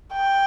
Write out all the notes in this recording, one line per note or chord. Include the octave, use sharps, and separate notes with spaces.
G5